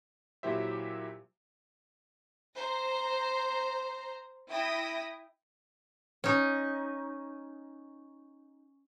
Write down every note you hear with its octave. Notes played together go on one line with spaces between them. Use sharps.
A#2 F#3 E4 G4 C5 E5
C5 A#5
E4 G5 D#6 A#6
C#4 D#4